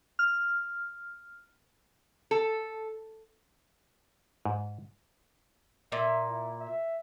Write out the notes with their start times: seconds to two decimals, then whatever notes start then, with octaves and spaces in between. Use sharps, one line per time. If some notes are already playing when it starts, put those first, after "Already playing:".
0.19 F6
2.31 A4
4.45 G#2
5.92 A#2 E5
6.30 E4
6.60 E5